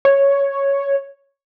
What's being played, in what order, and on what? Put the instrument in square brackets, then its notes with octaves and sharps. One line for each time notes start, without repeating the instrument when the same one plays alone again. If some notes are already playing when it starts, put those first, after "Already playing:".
[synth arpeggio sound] C#5